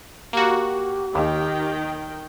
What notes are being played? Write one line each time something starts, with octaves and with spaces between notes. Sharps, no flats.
A#3 F#4 G4
D#2 D#3 G5